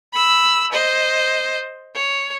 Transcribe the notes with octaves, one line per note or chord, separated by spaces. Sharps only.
B5 E6
C5 D#5
C#5